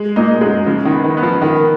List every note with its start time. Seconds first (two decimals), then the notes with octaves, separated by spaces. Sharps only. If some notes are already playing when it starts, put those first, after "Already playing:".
Already playing: G#3
0.16 A#2 A#3 D#4
0.41 F#2 F#3 G#3
0.66 C#3 F3
0.85 D#3
0.92 B3
1.04 D#3
1.17 B3
1.23 F3
1.41 D#3 A#3